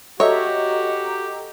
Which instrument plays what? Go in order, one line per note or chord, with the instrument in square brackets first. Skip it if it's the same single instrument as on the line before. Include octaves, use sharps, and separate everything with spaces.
[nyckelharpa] F#4 [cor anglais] G4 [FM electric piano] A4 D#5 A#5 [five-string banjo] C#5 E5